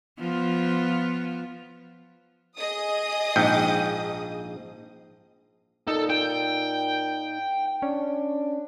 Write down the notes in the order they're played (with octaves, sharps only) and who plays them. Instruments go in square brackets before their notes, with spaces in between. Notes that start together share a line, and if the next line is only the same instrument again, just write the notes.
[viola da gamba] F3 B3 F4
[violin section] G#4 D#5 D#6
[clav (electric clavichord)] A#1 G#2 G5
[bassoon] A#2 [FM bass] D#4 [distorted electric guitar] A4
[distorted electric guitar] G5
[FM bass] C#4 [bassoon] D4